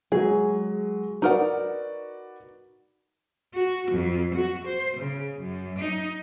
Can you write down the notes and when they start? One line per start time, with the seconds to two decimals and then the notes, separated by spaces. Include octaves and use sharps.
0.12 F#3 G#3 G#4
1.22 D#4 F#4 A#4 B4 D5 F#5
3.54 F#4
3.91 F2
4.35 F#4
4.67 C5
4.97 C#3
5.39 F#2
5.78 D#4